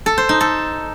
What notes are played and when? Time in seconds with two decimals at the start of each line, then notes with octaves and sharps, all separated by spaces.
0.06 A4
0.18 C5
0.29 D#4
0.41 A4